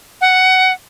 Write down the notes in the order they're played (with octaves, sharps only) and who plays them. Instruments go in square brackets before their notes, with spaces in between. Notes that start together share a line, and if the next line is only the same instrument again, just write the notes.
[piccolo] F#5